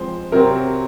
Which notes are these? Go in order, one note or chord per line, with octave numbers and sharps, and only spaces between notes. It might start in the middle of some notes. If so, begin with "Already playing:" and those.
Already playing: F3 G#3 C4 C5
C3 F#3 C4 A#4